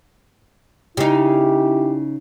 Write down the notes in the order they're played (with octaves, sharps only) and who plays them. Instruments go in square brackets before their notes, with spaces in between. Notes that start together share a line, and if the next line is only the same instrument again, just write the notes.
[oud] C#3 D#4 [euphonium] E4 [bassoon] G4